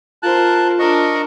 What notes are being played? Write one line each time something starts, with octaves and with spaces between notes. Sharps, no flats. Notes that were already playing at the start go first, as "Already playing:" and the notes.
F4 A#4 C5 A5 F#6
D4 A#4 D#5 C#6